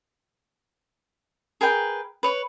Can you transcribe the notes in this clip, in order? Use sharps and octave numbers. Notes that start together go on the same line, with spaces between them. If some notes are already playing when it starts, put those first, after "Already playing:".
G#4 A#4 B4 G5
B4 C#5